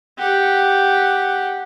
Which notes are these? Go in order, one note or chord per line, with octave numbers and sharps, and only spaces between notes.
G4 F#5